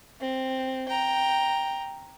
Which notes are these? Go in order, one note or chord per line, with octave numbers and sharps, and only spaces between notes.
C4
G5 A#5